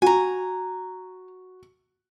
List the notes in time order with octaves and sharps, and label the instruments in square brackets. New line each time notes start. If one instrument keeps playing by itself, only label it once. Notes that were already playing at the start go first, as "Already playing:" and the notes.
[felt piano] F#4 [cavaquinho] G#5 A#5